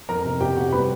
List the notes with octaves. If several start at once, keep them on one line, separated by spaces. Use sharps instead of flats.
F2 A#4 A#5
C3
C3 G4 G5
C3 F#4 F#5
G3 B4 B5